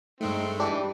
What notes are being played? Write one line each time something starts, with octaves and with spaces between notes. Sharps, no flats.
G2 G#3 A3 C4 D#4
E3 G3 D4 G4